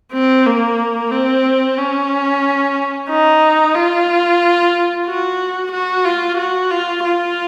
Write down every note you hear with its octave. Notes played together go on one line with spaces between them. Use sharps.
C4
A#3
C4
C#4
D#4
F4
F#4
F#4
F4
F#4
F4
F4